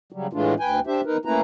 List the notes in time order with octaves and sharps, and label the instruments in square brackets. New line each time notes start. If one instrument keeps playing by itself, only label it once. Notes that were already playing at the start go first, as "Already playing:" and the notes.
[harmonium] C#3 F#3 G3
A2 E3 G#3 A3 D4 F4
D2 B4 G5 G#5
D4 G4 C5 E5
E2 D#4 A#4 B4
A3 A#3 C#4 E4 B4 A#5